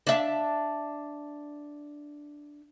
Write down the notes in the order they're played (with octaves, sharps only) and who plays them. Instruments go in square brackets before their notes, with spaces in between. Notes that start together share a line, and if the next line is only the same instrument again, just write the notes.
[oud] D4 E5